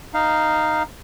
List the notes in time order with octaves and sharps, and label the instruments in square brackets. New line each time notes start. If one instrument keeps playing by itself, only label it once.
[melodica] D#4 F5